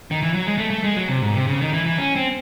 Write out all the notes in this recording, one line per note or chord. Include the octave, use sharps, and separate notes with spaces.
D#3
E3
F#3
G#3
A3
A3
G#3
F#3
C3
G#2
C3
C#3
D#3
E3
E3
C#4
C4